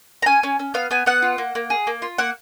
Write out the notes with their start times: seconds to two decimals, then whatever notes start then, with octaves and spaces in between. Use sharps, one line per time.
0.22 A#5
0.26 C#4 G#5
0.43 C#4
0.59 C#4
0.74 B3 F5
0.91 B3 G#5
1.06 B3 F#5
1.22 F4
1.38 A#3
1.55 A#3
1.70 G#4
1.87 A#3
2.02 F4
2.18 A#3 F#5